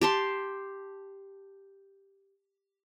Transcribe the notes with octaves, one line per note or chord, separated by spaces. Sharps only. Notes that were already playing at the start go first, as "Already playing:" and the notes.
G4 A5 C6